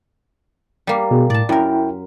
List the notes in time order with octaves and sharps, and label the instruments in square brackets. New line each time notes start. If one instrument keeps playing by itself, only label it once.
[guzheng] G3 A#3
[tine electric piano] B2 G#4
[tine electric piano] A2 [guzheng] D5 A5
[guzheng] F#2 A#4 [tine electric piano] E4 G5